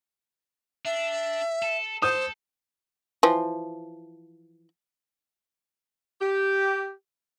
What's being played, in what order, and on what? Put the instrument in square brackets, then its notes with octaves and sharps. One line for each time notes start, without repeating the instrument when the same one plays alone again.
[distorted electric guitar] D4 [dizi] E5
[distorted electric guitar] A4
[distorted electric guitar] A4 [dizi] C5 [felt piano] D#6 G6
[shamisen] E3 F3
[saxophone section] G4